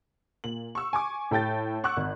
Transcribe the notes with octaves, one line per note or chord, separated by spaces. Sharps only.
A#2 F#7
C#6 E6
G#5 C#6 D6
A2 A4 G5 G6 A6
F#5 C#6 D6 E6 F#6
G#1